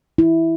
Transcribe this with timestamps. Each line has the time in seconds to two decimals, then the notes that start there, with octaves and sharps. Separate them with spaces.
0.18 E4